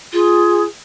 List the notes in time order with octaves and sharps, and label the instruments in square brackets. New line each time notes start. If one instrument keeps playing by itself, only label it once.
[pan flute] F4 [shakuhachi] G#4